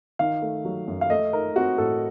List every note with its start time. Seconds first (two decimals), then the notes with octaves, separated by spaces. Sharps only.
0.19 D#3 F5
0.42 A3
0.65 F#3
0.88 F#2
1.01 F5
1.10 A3 D#5
1.33 D#4 A#4
1.55 C4 F#4
1.78 A2 A4